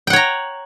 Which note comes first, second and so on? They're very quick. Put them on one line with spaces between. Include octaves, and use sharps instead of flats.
G5 F#5 C#5 A#5